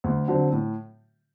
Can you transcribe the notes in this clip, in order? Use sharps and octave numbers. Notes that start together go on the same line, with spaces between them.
D2
D3 F#3 C4
A2